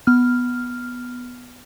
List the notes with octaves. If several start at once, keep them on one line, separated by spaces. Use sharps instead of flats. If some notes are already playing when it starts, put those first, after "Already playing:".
B3 F6